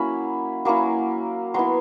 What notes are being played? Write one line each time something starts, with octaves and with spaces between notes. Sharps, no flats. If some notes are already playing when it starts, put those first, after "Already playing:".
Already playing: F#3 A#3 C#4 E4 B5
F#3 A#3 C#4 E4
F#3 B3 E4 C6